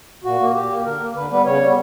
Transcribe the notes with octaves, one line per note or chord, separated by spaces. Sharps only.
A#2 F#4
A#3
A#2 G4
A#3
D3 A#4
A#3
D3 B4
G3 B3 B4
C#3 C#5
G3 B3